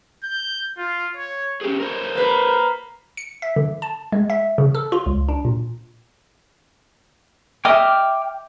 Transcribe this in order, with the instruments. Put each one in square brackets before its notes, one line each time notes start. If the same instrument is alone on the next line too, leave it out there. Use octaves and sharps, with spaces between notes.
[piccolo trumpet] G6
F4
C#5
[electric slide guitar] C#4 G4 G#4
A#4 C5 C#5
[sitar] A#3 B4
[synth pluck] C#7
E5
D3
A5
G#3
E5
C#3
A4
F4
C#2
D4
A#2
[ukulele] D#5 E5 [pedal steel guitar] G5 D6 F6